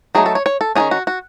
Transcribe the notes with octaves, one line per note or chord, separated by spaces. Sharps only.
F#3 A3 D#4 G#4
A4
C#5
C#5
A4
D#3 F#3 C#4 G#4
F#4
F#4